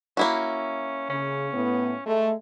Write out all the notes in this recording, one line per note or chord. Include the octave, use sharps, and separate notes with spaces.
A#3 C#4 E4 F#4
C#3 C#4
A2 B3
G#3 A3